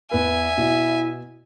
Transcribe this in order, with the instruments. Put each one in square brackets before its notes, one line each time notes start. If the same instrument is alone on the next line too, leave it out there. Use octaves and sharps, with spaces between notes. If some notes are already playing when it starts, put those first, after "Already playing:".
[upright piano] E2 B4 [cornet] E5 [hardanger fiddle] G#5
[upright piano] B2 [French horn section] E4